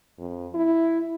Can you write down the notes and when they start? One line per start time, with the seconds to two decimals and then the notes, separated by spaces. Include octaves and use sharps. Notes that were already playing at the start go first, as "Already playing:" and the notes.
0.19 F2
0.55 E4